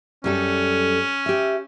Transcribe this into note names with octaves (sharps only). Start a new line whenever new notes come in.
F#2 G3 C#4 A4
G4 E5